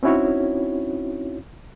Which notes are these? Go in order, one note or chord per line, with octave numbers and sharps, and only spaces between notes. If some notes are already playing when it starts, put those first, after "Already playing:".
C4 C#4 D#4 E4 F#4 C#5